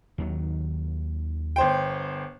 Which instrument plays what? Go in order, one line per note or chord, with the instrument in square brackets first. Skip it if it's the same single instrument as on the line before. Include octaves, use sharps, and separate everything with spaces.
[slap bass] D#2 D#3 F#3
[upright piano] G1 C5 G5